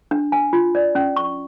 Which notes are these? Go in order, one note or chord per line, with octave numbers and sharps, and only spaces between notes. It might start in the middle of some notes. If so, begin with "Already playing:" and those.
D4
G#5
F4
D5
C#4
C#6